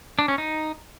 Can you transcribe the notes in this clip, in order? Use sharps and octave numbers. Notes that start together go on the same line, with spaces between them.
D4
C#4
D#4